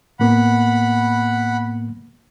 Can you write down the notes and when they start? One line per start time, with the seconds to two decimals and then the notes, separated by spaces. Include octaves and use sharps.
0.20 A2 A#3 B3 F#5 B5